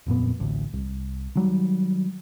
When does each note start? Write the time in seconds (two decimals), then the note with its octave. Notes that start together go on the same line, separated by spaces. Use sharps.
0.06 D1 F2 A#2 B3
0.40 A1 D2
0.73 C2
1.35 D#3 F#3 G3